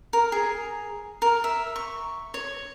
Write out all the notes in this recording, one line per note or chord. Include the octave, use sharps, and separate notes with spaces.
A#4
G#4
A#4
E5
C#6
C#5